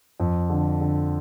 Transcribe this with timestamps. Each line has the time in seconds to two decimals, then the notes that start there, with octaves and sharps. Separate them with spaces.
0.20 F2
0.50 D3
0.81 D3